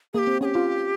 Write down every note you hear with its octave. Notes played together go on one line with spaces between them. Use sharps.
A#3 G4 G#4
C4
C#4 G4 G#4
F4